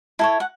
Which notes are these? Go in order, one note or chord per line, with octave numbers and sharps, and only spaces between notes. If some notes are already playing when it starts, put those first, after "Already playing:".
E4 A4 C#5 A5
F#5